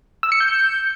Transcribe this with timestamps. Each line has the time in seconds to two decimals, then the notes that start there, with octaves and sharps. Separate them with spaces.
0.23 E6
0.32 C#7
0.40 G6